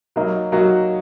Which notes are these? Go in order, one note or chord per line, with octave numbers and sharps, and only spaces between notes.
F#3 A#3 D#4 F#4
F#3 A#3 D#4 F#4